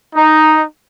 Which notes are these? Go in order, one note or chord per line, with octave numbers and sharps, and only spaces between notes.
D#4